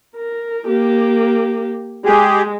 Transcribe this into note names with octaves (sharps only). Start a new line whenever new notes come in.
A#4
A#3 G4
G#3 G4 G#4